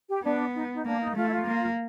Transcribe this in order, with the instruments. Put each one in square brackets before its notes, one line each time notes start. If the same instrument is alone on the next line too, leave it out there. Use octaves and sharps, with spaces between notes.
[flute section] G4
[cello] B3 [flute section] D4
[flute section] D#4
D#4
[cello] A#3 [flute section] D4
[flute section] D#4
[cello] A3 [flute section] F4
[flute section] E4
F4
[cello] A#3